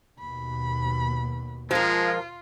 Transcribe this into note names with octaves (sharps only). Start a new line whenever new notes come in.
D#2 B2 B5
F3 G#3 F4 A#4